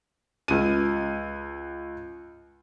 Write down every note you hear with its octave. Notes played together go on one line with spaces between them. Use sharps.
C#2 D#7